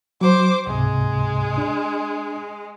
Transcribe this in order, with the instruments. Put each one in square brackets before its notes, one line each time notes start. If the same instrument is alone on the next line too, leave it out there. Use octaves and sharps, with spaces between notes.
[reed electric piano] F#3 [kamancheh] C5 D6
[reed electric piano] C#2 G#2 C3 [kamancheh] G#3
[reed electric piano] D4